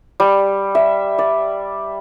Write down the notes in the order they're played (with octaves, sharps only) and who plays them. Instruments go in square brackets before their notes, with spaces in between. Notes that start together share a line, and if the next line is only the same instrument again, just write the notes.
[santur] G3
E5
D5